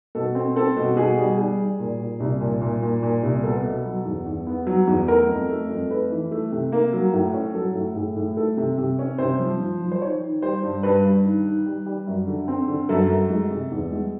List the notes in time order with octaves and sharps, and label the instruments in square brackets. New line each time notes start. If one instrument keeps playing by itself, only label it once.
[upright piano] B2 A4
C4
C4 A4
B2
B2 G#4
G3
G3 G#4
G3
A#2
A#2
C2
A#2
A#2
A#2
A#2
C2
B3 A4
B2
F#3
E2
E2
B3
F#3
E2
A3 A#4
F2
A3
F2
A3 B4
E3
A3
C3
A#3
F#3
A2
C#4
F#3 A4
A2
A2 G#4
A2
A3 A4
C3
C3
C#4
C3 C5
F3
F3
F3
C5
D#3 C#5
D#3
G3 C5
G2
G2 B4
G2
D#3
D#3
G3
G3
F#2
D3
C4
D3
F#2 A4
F#2
G#3
C3
E2
G#3